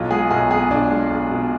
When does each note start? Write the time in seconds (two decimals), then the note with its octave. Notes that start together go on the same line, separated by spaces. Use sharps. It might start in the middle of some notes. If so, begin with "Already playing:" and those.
Already playing: B1 F4
0.11 G#3 G#4
0.31 B1 G#4
0.51 B2 G#4
0.70 B1 D4
0.91 G#3
1.11 B1
1.31 B2